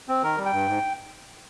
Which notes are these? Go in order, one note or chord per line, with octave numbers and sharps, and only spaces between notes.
C4
D#3 A#4
G3
G5
G2
G#2